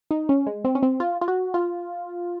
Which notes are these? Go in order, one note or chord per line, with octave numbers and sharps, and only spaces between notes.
D#4
C#4
G#3
C4
C#4
C4
F4
F4
F#4
F4